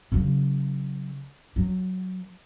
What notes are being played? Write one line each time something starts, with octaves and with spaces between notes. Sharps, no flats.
C#3 F#3
F#3